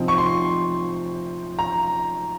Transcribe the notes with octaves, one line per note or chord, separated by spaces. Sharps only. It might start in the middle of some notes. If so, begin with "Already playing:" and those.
Already playing: C3 F3 C4 D#4
C#6
C6
A#5